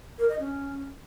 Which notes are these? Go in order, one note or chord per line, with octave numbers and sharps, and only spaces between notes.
A#4
D#5
C#4